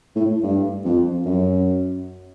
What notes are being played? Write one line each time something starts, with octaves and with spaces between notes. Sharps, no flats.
A2
G2
F2
F#2